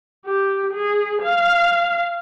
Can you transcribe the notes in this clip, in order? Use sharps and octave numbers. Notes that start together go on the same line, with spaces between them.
G4
G#4
F5